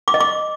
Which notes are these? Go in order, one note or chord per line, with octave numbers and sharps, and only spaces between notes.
D6
D#5
D6